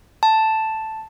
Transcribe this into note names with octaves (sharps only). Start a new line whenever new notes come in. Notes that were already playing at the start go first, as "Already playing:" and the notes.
A5